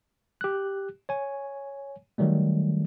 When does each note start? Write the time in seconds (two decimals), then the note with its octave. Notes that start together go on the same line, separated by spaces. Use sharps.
0.41 G4 F#6
1.09 C#5 G#5
2.18 D#3 F#3 G3 A3